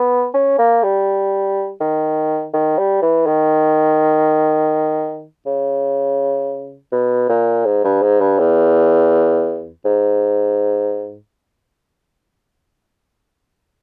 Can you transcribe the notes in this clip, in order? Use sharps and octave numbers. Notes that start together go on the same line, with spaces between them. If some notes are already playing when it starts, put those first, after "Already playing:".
Already playing: B3
C#4
A#3
G3
D#3
D#3
G3
E3
D#3
C#3
B2
A#2
G#2
G2
G#2
G2
E2
G#2